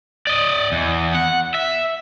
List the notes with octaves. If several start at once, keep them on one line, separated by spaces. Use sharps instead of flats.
D5 D#5
E2
F#5
E5